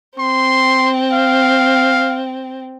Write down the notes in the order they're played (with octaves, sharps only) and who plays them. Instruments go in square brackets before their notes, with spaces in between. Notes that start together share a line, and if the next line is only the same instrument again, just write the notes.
[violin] C4 [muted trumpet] C6
[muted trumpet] F5